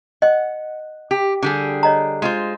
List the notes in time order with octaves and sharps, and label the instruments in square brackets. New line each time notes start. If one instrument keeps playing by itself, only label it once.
[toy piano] D#5 [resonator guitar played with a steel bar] F#5
[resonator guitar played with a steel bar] G4
D3 G3 G#4
[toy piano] C#5 D#5 A#5
[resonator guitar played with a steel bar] G#3 F4 C5